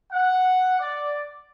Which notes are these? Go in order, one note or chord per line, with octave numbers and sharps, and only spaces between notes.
F#5
D5